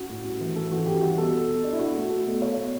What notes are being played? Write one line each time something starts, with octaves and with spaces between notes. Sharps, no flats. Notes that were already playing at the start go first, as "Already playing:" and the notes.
Already playing: C#4 F#4
A2
G3
E3
C#4 A4
E3 F#4
E3 G4
G3 F#4
B2 A4
B2
B2
D4
E4
B2 F#4
A3
A3 A4
B2
B2 C#5
B2